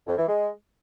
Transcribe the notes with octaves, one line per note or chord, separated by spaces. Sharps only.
F2
E3
G#3